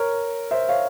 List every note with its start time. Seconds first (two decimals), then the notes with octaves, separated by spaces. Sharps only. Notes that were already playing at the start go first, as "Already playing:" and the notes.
Already playing: A#4 C#5
0.51 C5 E5
0.69 C#5 F5